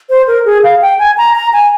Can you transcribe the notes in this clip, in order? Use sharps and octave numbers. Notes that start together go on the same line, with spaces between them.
C5
A#4
G#4
F5
G5
G#5
A#5
A#5
G#5